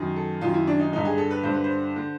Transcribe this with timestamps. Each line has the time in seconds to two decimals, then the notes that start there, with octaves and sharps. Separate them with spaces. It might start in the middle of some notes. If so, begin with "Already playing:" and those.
Already playing: F#2 D#3
0.16 A4
0.41 F#2 D#3 F4
0.54 E4
0.67 D4
0.80 D#4
0.92 G2 D3 D#4
1.05 G#4
1.18 A4
1.31 B4
1.44 G2 D3 C5
1.54 B4
1.64 C5
1.96 D3